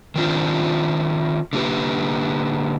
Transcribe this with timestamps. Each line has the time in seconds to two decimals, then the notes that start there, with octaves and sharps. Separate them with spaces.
0.15 D#3 F3 C4 D4 F4
1.53 D3 A#3 G4 B4